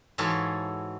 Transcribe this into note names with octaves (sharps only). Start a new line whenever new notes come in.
G#2 E3 F#4 A4 C#5 F5